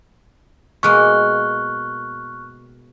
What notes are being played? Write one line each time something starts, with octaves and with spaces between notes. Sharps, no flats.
B2 G#3 A#3 C#6 F6 F#6